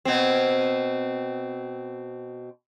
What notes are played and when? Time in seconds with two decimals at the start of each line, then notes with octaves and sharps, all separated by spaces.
0.05 B2 C4